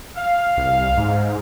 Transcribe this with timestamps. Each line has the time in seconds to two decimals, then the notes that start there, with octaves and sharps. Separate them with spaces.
0.16 F5
0.57 C2
0.97 G#2